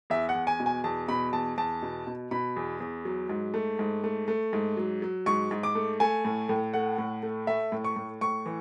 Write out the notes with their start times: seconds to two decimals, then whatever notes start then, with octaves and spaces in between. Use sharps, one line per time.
0.10 E2 E5
0.29 F#5
0.35 E2
0.47 G#5
0.60 B2
0.66 G#5
0.84 E2 A5
1.08 B2 B5
1.33 E2 A5
1.58 E2 A5
1.82 B2
2.07 B2
2.31 B2 B5
2.56 E2
2.80 E2
3.05 F#3
3.29 G#2
3.54 A3
3.79 G#2
4.04 A3
4.28 A3
4.53 G#2
4.77 F#3
5.02 F#3
5.26 G#2 C#6
5.51 G#2
5.63 D6
5.75 A3
6.00 A3 G#5
6.25 A2
6.49 A2
6.73 A3 F#5
6.98 A2
7.23 A3
7.47 A3 E5
7.72 A2
7.84 C#6
7.96 A2
8.21 A2 C#6
8.46 E3